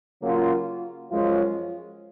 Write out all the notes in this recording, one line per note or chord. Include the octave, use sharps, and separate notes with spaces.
C#3 F#3 A#3 F4
F#2 F3 G#3 C#4 F4